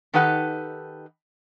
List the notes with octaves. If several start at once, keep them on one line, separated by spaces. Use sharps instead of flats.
D#3 D#4 G4 A4 B4 F#5